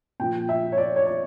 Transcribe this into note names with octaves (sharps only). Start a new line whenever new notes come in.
A#2 F3 G5
E5
C#5
D5
C#5
D5